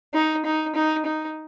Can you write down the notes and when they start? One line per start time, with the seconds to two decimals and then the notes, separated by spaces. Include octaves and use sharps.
0.14 D#4
0.45 D#4
0.75 D#4
1.05 D#4